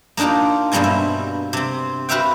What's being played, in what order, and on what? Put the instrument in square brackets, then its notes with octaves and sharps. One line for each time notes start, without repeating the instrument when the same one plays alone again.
[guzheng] A#3 D4 D#4 F4 G4
G2 B2 G3 A#3 C4 G#5
E5
C3 C4
F#4 B4 C5 E5 F5 G5